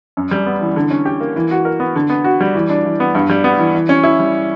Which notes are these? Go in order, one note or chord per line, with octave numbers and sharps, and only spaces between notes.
F#2
G3
B3
E3
D3
C#4
G4
A#3
E3
F#4
A#4
B3
D3
B3
F#4
G3
E3
D4
E3
B3
G2
G3
B3
E3
E3
C#4
E4
G3